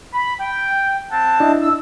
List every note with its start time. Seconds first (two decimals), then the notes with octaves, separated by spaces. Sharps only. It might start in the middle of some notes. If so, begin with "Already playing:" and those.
0.14 B5
0.40 G5
1.11 C4 F#5 A5
1.40 D4 E4 D#5
1.62 E6